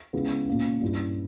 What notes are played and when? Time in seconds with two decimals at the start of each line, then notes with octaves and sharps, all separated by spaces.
0.13 C#3 G#3 B3 E4
0.48 A#2 A#3 C#4
0.81 G2 G3 C#4 E4